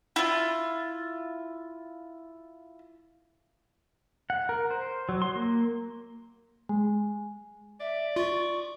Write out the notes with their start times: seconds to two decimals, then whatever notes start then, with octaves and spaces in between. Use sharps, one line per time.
0.16 E4 F4
4.30 F#5
4.49 A#4
4.71 C5
5.09 F#3
5.22 C6
5.36 A#3
6.69 G#3
7.80 D5 E5
8.16 F4 C#6